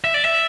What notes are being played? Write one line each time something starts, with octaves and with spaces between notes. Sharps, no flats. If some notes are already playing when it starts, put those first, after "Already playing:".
E5
D5
E5